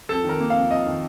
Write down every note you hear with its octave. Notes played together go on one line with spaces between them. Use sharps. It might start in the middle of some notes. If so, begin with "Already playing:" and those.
F2 A4
D#3 A#4
A#3
F5
F2
F2 D#5
D#3